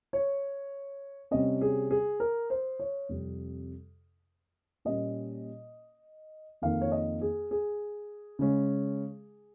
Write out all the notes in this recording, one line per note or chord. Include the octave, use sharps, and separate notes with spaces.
C#5
C3 G3 C#4 D#5
G#4
G#4
A#4
C5
C#5
F2 C3 G3
A#2 G3 A#3 C#4 D#5
F2 D#3 A#3 F5
C#5
D#5
G#4
G#4
C#3 G#3 C#4